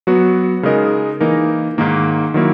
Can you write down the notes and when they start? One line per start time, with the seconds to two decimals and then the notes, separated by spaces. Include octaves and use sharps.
0.07 F#3 B3 F#4
0.63 C#3 G#3 D#4 A#4 D#5
1.20 E3 A#3 D#4 A#4
1.78 G#2 D#3 A#3
2.34 D#3 F#3 A#3 E4